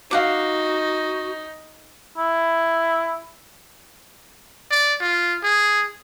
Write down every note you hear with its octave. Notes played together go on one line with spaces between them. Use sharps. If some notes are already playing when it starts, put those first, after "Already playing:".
D#4 F#4 F5 F#5 D6
E4
D5
F4
G#4